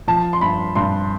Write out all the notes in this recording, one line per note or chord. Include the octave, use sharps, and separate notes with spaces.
F3 A5
C6
G2 B5
G2 C6